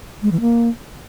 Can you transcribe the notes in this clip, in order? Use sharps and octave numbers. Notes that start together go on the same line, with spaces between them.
G#3
E3
A#3